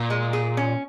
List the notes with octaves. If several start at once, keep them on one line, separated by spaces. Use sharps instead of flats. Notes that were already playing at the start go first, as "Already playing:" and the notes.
Already playing: A#2
G#3
G#4
C#4